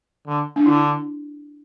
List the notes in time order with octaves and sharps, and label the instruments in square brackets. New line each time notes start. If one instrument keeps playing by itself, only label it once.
[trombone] D3
[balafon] D4
[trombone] D3 [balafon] E4